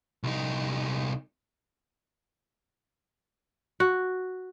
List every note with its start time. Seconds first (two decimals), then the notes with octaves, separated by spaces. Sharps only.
0.23 C2 D#4
3.80 F#4